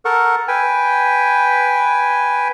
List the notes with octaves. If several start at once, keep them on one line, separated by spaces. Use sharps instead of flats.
A4 A#4 F#5 C#6
B4 G5 G#5